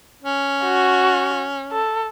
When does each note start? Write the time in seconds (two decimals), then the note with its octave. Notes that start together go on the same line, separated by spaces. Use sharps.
0.22 C#4
0.64 F#4
1.72 A4